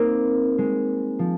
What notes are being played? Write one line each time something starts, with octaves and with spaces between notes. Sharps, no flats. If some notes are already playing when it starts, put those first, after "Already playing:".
Already playing: A#3 C4 D#4
G#3
F3